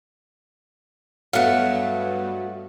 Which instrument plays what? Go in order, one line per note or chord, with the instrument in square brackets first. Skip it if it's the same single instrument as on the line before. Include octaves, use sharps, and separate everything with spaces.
[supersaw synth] G2 B3 [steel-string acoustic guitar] F#3 A3 [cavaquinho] F5 F#5